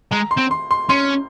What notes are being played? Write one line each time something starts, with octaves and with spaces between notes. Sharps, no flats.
G#3 A#5
C6
C4
C6
C6
C#4 C6